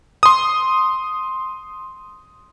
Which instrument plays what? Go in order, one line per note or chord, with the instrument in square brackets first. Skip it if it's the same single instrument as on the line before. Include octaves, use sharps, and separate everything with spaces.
[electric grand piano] C6 D#6